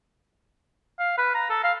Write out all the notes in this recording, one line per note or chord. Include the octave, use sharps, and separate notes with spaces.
F5
B4
A#5
A4
F5